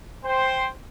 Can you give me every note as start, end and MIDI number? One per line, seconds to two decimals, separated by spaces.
0.24 0.67 72
0.24 0.67 79